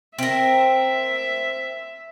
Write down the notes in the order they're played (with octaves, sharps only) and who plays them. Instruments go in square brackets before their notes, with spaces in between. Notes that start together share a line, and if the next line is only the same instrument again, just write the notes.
[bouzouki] C4 A#4 [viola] E5